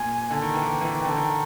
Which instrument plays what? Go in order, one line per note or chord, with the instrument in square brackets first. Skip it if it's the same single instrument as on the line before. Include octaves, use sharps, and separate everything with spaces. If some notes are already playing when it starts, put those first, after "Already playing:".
Already playing: [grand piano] A#2 [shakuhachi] G#5
[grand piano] D3
D#3
[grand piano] E3 [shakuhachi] G5
[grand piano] E3
D#3
D3
D#3